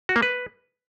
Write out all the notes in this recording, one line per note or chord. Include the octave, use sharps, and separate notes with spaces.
F#4
A#3
B4